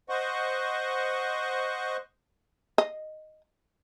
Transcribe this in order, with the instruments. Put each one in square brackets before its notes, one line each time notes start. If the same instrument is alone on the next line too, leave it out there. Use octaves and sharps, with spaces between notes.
[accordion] C5 D#5 F#5 C#6
[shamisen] D#5